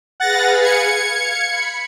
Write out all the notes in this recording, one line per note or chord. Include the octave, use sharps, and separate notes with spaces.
G#4 B4 F5 F#5 A6 A#6
G#6 C#7
F5
B5